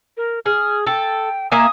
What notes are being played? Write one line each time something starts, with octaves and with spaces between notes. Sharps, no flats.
A#4
G#4 F6
A4 G5
A#3 E5 G#5 D#6